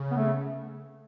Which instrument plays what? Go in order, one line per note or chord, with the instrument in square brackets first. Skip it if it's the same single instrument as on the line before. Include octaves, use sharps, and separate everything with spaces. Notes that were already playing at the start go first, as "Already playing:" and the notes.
Already playing: [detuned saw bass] C#3
[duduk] B3
A3